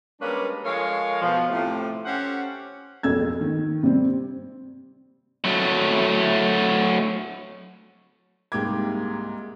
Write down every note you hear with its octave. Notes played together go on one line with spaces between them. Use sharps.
G3 G#3 A#3 C#4 D4 B4
F3 G#3 A4 A#4 C#5 F5
B2 F3
A2 C3 F3 A3
C#4 G4 A4 C5 F#5
F#1 B1 F2 E6 G#6
D#3
C3 G3 C4
F#3 A3
C2 G#2 A#3 G5 D6 G#6